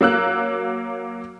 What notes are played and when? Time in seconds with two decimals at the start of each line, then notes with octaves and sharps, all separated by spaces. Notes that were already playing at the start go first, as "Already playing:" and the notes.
0.01 F#3 A#3 E6 F#6